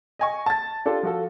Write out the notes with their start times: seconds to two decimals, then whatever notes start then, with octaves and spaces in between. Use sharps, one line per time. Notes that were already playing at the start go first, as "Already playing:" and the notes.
0.19 D#5 G#5 C#6
0.46 A5 A6
0.85 D4 F4 G4 A4
1.03 F3 F#4 A4